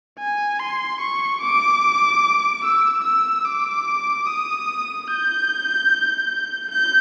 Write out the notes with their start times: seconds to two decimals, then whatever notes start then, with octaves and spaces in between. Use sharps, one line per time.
0.19 G#5
0.59 C6
1.00 C#6
1.41 D6
2.63 E6
3.04 E6
3.45 D6
4.26 D#6
5.08 G6
6.71 G6